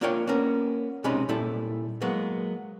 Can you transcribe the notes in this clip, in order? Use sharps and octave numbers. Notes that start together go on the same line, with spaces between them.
A#3 D4 F4 A#4 C#5 G5
A#3 B3 C#4 A#4
B1 C3 G#3 C#4 D#4 B5
A#2 G3 E4 A4
F#3 G#3 A#3 B3